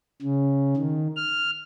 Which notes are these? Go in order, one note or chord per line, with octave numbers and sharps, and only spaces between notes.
C#3
D#3
F6